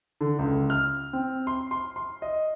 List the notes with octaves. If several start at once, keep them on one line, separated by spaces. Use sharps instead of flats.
D3
C#2
F6
C4
C6
C6
C6
D#5